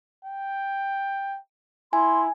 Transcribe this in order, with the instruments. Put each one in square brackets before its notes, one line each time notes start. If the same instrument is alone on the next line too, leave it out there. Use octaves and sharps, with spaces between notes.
[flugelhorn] G5
[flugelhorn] E4 [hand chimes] G#5 [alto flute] C6